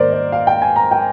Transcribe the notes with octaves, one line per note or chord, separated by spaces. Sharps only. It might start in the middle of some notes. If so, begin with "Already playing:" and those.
Already playing: G#2 D#3 A#3 A#4 C5 D5
D5
F5
G5
G#5
A#5
G5